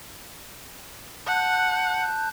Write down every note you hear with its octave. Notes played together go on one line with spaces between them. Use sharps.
F#5 A5 F#6 G6